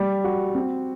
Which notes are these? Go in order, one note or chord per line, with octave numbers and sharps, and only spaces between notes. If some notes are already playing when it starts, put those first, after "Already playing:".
Already playing: G3
F#4
C4